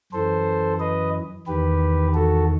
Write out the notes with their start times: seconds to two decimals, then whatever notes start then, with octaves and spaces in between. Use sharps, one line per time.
0.12 F#2 E3 A4 C5
0.80 B4 D#5
1.47 E2 D#3 G4 B4
2.14 F#4 A4